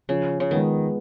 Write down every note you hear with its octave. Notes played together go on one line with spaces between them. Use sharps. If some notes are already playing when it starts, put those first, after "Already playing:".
C#3 F3
C#3
D#3 G#3 B3